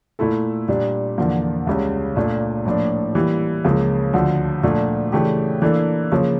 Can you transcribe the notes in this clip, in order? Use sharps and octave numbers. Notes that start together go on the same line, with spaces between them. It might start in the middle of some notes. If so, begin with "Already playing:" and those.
A#2 A3 E4 A4
A#2 G3 D4
E2 D3 F3 A#3
C#2 C#3 G3 C#4
A#2 A3 D4
A2 F3 A#3 D4
E3 G3 A#3
C#2 C#3 F3 A#3
D2 D3 F3
A#2 F3 A3 D4
C#3 E3 A3 D4 G4
E3 A#3 D4 A4
C#3 F3 A#3 C#4